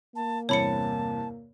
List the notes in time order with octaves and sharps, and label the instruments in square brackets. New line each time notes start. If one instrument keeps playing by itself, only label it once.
[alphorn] A#3 [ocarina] A5
[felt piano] E2 G2 C3 [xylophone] C#5 B5 C#7 [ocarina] A5